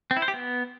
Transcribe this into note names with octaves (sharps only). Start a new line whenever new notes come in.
C4
E4
C5
G4
B3